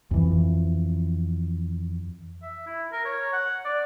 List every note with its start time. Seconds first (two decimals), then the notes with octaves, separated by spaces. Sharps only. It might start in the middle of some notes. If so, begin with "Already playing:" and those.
0.11 F2 E3
2.42 E5
2.66 E4
2.92 A#4
3.05 C#5
3.33 F#5
3.64 D5